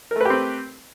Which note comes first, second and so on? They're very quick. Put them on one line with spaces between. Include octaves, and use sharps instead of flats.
A#4 A3 B4 G4 C4